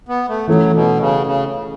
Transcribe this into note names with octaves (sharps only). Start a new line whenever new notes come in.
B3
A3
E3 F#3 A3 C#4
B2
C#3
C#3